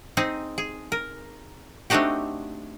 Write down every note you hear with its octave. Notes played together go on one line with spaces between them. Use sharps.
C4 D#4 G#4
G#4
A#4
A3 C4 D4 D#4 F#4 G4